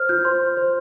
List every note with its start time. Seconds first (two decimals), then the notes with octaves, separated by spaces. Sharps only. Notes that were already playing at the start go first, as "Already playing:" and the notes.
Already playing: C5 F6
0.09 F4 G6
0.25 C5 C6
0.41 C5
0.57 C5